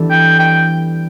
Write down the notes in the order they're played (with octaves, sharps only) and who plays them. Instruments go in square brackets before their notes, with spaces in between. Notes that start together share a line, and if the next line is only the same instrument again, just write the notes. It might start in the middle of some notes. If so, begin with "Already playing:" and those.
Already playing: [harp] E3 G3 B3 D4 A4
[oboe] G5
G5